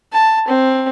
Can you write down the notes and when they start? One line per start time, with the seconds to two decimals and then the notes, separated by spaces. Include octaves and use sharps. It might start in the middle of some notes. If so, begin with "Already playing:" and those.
0.13 A5
0.48 C4